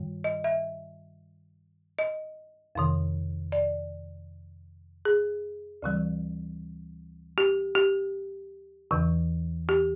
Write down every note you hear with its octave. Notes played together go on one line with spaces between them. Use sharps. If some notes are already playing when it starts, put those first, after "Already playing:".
Already playing: G2 D#3 G3
D#5
E5
D#5
F2 C3 D#3
D5
G#4
D2 C#3 E3 G3
G4
G4
E2 C#3 E3
G4